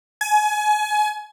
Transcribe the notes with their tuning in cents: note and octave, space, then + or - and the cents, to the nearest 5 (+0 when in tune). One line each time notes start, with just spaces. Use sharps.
G#5 +30